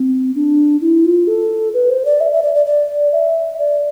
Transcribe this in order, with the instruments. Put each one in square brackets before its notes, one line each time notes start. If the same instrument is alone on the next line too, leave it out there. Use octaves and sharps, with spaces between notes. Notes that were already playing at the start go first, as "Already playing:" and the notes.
Already playing: [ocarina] C4
D4
E4
F4
A4
B4
C5
D5
E5
E5
D5
D5
D5
E5
D5